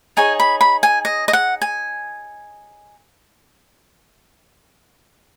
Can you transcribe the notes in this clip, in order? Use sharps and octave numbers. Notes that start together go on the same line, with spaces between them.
D#4 G#4 C#5 G#5
B5
B5
G#5
D#5
D#5
F#5
G#5